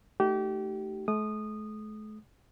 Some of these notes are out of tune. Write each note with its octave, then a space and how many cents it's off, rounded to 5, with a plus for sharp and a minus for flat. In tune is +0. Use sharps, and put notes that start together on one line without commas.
A3 +0 D#4 +0 G4 -30
A3 -45 D#6 -15